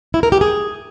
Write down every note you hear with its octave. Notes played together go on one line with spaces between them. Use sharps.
E4
A#4
G4
G#4